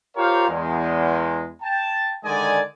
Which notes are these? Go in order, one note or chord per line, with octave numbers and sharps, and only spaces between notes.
F4 G4 A#4 C5 C#5 F5
E2 G#3
G5 A5
D3 D#3 G#3 D5 D#5 G#5